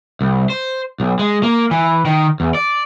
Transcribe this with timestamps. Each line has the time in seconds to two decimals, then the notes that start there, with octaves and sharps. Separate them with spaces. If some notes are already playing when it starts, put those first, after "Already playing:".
0.21 C2
0.50 C5
1.00 B1
1.19 G#3
1.43 A#3
1.71 E3
2.05 D#3
2.40 E2
2.55 D5